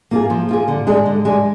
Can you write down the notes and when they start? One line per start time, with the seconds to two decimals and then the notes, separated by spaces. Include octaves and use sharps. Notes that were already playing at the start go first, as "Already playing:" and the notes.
0.11 A#3 F4 G#4
0.30 F3
0.49 A#3 F4 G#4
0.68 D3
0.87 G#3 D4 G#4
1.06 D3
1.25 G#3 D4 G#4